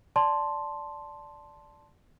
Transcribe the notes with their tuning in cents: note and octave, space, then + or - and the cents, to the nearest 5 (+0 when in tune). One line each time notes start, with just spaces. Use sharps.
D5 +0 A5 +0 C6 +5